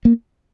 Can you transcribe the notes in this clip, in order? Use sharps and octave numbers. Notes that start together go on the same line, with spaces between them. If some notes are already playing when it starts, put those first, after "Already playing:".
A#3